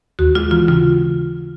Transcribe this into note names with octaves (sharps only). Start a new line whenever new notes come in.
D#2 F#4
G#3 F4
E3 F4
C#3 F4